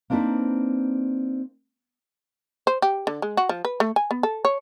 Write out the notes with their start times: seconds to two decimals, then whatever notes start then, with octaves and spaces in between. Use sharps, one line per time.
0.10 A#3 C4 D4 D#4 B4 C5
2.67 C5
2.82 G4
3.07 D3
3.22 G#3
3.37 F#4
3.49 F3
3.65 B4
3.80 A3
3.96 G#5
4.11 B3
4.23 A4
4.45 C#5